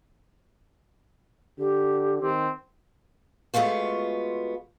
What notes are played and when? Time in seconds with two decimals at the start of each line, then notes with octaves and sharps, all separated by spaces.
1.59 D3 G4
2.22 D#3 C4
3.54 G#3 A3 B3 F4 F#4